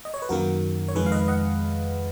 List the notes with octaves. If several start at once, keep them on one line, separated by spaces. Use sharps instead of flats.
D#5
C#5
B4
F#2 D#3 A#3 F#4 A#4
C#5
F2 D#3 G#3 G#4 B4
F5
B4 D#5
D#5 F#5